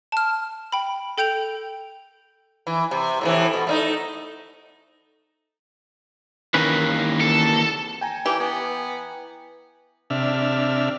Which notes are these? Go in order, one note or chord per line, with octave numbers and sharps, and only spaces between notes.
A5 F6
G5 B5
A4 G5 G6 D7 F7
E3
C3
A2 C3 E3
B2
A3 C#4 D#4
D#3 E3 A#3 C#4 B4
A4
G5 G#5 A#5
E3 G4
B3
C3 D4 E5 F6